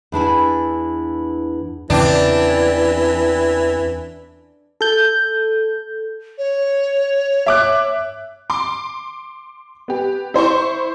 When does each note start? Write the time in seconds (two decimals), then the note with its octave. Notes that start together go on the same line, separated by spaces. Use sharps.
0.12 E2 D4 E4 G#5
1.90 E2 C#3 E3 C4 D4 D5 G5 A5
4.81 A4 G6
6.38 C#5
7.46 E5 D6 F#6
8.50 C6 D6
9.88 B3 G4
10.34 E4 C5 C6 C#6